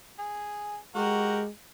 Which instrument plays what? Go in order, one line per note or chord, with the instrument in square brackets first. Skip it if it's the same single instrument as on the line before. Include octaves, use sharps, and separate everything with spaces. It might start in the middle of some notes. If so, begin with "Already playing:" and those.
[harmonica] G#4
[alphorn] G#3 [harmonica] F#4 G4 A#4